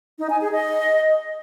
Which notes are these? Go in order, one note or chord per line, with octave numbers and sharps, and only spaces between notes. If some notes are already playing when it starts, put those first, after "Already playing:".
D#4
G#5
G#4
D#5